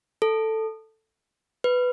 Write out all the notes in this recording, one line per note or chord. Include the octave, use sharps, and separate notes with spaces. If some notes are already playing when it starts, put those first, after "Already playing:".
A4
B4